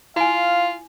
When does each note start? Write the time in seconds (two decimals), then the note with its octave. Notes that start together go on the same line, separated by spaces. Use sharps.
0.16 E4 F4 F5 G#5